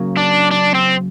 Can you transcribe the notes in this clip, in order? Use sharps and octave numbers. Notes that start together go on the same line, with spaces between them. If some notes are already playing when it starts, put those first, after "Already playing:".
Already playing: C#3 F#3 A#3
D4
D4
C4